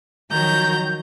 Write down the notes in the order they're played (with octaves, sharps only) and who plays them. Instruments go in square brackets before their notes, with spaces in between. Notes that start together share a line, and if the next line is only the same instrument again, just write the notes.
[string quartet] D#3 F3 F#3 A#5 G6